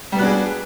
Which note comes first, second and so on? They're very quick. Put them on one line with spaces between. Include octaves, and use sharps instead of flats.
G3 B3 F#4 D4 G#4